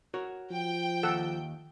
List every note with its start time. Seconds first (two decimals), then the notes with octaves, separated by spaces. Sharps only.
0.14 F#4 A#4 C#5
0.51 F3 G5
1.03 D#2 A4 F#5 E6